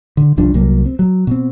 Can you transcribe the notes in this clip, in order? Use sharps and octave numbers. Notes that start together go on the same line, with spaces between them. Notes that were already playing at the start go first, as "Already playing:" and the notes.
D3
C2 G2 F3 D4
C2 F#3 A#3
C4
F#3
B2 C4